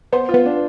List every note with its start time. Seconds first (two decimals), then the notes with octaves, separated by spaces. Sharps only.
0.12 B3 C5
0.29 F4
0.34 B3
0.45 D4